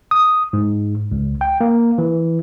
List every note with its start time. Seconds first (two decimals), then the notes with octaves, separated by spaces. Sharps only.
0.11 D#6
0.53 G#2
1.12 C#2
1.41 G5
1.61 A#3
1.98 E3